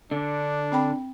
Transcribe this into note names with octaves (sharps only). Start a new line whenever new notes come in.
D3 D4
C4 G5 B5